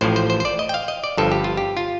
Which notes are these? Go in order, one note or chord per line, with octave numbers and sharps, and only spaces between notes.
A1 A2 F3 C5
C5
C5
C5
D5
D#5
G5
F5
D#5
D5
G1 G2 F3 A4
G4
F4
G4
F4